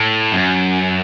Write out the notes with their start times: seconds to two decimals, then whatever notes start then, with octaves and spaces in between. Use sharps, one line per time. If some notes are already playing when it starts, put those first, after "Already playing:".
Already playing: A2
0.32 F#2